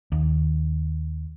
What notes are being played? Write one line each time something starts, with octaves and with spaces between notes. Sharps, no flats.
D#2